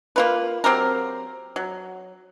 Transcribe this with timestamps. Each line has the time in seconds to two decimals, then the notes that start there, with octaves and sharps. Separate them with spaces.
0.16 A#3 F4 B4
0.64 F#3 C4 G4 A#4
1.56 F#3